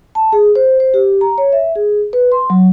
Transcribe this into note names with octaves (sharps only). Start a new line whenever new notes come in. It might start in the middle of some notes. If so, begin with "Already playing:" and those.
A5
G#4
C5
C5
G4
A#5
C#5
E5
G#4
B4
C6
F#3